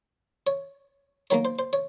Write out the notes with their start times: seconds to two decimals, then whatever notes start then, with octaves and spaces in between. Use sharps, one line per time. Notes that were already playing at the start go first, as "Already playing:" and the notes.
0.47 C#5
1.30 D#3 F#3 A#3 C#5
1.45 C5
1.59 C5
1.73 C#5